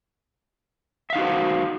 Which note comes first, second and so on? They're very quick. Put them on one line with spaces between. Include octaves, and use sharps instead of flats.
E5 F5 D#4 F#4 C5